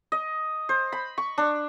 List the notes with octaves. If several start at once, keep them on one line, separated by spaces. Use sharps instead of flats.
D#5
C5
B5
C#6
D4